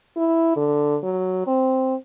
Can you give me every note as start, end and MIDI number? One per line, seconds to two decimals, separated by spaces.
0.17 0.54 64
0.56 0.97 50
1.03 1.44 54
1.47 1.95 60